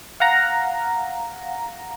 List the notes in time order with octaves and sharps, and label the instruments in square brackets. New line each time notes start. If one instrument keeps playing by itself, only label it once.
[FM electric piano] F5 F#5 A#5 A#6